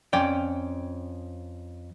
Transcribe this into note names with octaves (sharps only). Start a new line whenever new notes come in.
F2 C#4 D5 G5